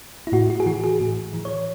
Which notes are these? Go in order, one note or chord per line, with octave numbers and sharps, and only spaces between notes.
E4
A2 F#4
F#4
G#4
E3 F#4
G#4
A2
E3
C#5